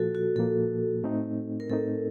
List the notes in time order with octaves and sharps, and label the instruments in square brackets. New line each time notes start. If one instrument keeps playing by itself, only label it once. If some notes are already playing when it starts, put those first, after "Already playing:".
Already playing: [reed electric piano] A#2 F3 A#3 [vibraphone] F#4 A4
[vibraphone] F#4
[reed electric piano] A#2 F3 A#3 [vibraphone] A4
[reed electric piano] A2 A3 C4 D#4
[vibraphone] A#4
[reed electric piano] A2 A3 C4 D#4 [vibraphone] A4